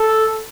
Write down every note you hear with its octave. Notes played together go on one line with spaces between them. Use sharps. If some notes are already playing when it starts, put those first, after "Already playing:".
Already playing: A4